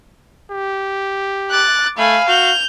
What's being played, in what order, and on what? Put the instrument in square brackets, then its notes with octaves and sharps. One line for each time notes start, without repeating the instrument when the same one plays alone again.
[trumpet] G4
[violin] D6 A6 [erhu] F#6
[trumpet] A3 [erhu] F5 [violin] G#5 B5
[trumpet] F#4 [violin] G6 F7